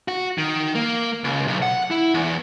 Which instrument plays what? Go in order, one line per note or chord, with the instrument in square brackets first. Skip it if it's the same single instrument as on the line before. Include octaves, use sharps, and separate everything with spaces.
[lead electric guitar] F#4
D#3
A#3
C#2
B1
F#5
E4
E2